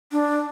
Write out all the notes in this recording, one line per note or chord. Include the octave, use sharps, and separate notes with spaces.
D4